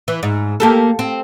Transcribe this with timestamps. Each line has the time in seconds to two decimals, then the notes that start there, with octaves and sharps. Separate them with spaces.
0.08 E3
0.23 G#2
0.60 A#3 G4 A4
0.99 C4